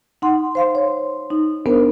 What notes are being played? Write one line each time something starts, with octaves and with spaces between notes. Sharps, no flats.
D#4 F#5 C6
C5 F5 C6
C#5
D#4
B3 D4 A#4 C5